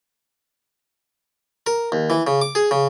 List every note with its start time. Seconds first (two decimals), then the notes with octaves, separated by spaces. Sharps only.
1.67 A#4
1.92 D#2
2.10 E3
2.27 C#3
2.42 D6
2.55 G#4
2.71 C#3